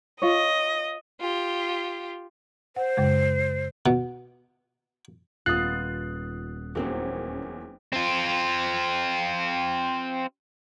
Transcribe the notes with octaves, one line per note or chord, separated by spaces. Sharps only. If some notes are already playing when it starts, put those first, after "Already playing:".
F4 C#5 D#5
F4 G4
C5 F#5
F#2 C#3 G#3
B2
D#1 B3 D#4 F4 D#6 F#6 A6 C7
E2 F#3 A#3 C4 C#4 D#4
C4 F4